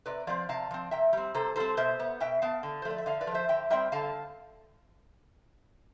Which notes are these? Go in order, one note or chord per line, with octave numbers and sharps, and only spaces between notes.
C3 B4 D5
F3 C4 D5 F5
C3 F5 A5
F3 C4
C3 E5 G5
G3 C4
C3 A4 C5
G3 C4 A4 C5
B2 C5 E5
B3
B2 E5 G5
B3 F5 A5
D3
C5
F3 A3
D5
E5
D3 D5 F5
B4 D5
F3 A3
C5 E5
D3 E5 G5
G3 C4 E5 G5
D3 F5 A5